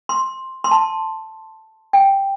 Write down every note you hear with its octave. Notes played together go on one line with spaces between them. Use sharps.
C6
C6
A5
G5